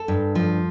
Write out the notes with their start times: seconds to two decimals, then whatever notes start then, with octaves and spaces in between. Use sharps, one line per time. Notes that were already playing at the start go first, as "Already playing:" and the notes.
Already playing: A4
0.08 G2
0.35 F3